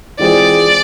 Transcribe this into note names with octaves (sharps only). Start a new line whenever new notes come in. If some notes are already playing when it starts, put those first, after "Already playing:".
E3 G#3 C4 F4 G#4 D5